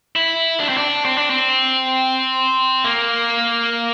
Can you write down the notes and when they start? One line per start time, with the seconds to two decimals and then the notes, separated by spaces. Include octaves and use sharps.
0.16 E4
0.60 D4
0.69 C4
0.77 D4
1.05 C4
1.18 D4
1.30 C4
2.85 A#3